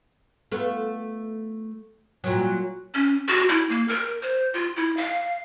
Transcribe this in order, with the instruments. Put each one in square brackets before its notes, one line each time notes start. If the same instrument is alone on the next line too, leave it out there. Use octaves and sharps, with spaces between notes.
[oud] A3 B3 F4
A#2 F#3
[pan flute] C#4
F#4
E4
A#3
A#4
C5
F4
E4
F5